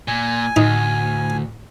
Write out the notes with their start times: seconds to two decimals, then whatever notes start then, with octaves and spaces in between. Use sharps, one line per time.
0.08 A#2 G#5
0.56 D2 A2 D#4